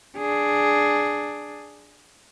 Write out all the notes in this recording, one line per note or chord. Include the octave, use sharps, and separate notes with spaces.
D4 G#4